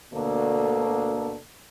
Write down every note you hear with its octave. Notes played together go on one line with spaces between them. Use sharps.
D2 B2 D3 A#3 D4 A4